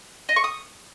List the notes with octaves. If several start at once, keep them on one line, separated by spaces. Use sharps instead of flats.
D#5
C#6
D#6